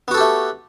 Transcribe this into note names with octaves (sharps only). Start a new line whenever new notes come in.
A3 B3 F#4 G4 A4